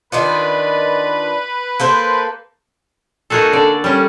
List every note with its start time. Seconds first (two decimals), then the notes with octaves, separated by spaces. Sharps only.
0.12 D#3 D4 F4 B4
1.80 A#3 A4 C5
3.30 A#3 D#4 F#4 G#4 A4
3.53 D3 D5
3.84 G3 C#4